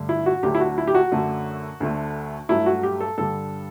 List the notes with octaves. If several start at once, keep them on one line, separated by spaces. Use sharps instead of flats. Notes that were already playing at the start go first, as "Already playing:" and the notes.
Already playing: G2 D3 A3
E4
F#4
D2 D3 F#3 A3 G4
E4
F#4
E4
G4
F#4
F#2 D3 A3
D2 D3 A3
G2 F#3 A3 E4
F#4
G4
A4
G2 D3 G3 A4